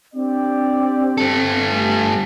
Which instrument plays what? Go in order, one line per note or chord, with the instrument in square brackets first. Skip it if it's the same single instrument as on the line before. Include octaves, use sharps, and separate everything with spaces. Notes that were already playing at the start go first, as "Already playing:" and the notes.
[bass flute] C4 [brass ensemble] D4 G4 D5
[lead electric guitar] G2 A4
[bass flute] A3 [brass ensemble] G4 G#5 A5